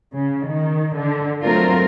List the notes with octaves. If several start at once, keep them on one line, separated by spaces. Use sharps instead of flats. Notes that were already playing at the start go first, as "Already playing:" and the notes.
C#3
D#3
D3
F#3 A3 C4 F4 A#4